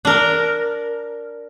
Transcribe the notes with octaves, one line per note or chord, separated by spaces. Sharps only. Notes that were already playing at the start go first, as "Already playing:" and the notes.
D4 A#4